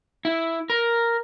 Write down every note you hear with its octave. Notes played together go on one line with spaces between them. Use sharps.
E4
A#4